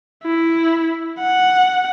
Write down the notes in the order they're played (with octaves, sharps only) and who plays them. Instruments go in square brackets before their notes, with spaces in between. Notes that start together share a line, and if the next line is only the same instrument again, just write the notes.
[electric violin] E4
F#5